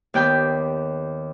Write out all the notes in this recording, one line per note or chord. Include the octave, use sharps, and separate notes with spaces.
D#2 B3 D5 G5 B5 G6